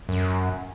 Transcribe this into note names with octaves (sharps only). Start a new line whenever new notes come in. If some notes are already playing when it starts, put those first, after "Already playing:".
F#2